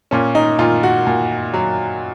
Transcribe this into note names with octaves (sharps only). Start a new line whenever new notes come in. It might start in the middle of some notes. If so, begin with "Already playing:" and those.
A#2 C#4
D#4
A#2 F4
F#4
A#2
F#3